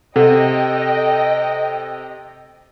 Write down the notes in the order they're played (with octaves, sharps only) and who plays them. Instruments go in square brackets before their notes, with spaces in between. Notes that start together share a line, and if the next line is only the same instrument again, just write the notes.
[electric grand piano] C3 [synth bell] A4 [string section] D#5 G5